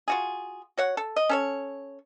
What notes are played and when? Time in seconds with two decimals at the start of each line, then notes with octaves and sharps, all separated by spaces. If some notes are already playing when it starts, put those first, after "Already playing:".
0.08 F4 F#4 G#4
0.77 F#4 C#5 F#5
0.97 A4
1.16 D#5
1.29 C#4 A4 C#5